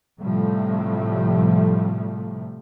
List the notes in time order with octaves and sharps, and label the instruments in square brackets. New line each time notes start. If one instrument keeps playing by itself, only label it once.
[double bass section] A2 C3 F3 G3 A3